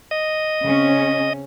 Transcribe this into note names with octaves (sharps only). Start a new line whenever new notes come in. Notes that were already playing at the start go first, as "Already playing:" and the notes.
D#5
C#3 C4 C#4